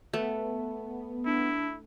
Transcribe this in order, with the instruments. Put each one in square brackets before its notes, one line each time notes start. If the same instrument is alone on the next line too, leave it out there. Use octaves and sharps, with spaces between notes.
[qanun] A3 [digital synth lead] B3
[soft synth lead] D4 [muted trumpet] E4